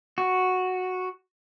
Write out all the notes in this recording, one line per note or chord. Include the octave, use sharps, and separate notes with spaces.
F#4